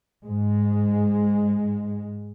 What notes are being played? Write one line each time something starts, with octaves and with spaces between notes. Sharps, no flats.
G#2 G#3